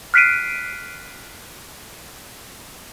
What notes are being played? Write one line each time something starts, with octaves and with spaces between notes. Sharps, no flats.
F6 F#6 B6 C7 D7 D#7